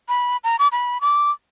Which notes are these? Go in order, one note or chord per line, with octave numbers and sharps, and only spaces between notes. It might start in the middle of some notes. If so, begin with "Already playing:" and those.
B5
A#5
D6
B5
D6